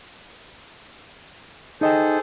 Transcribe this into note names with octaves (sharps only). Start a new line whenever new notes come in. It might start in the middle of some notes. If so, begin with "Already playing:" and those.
D#4 G#4 A4 C5 D#5 G5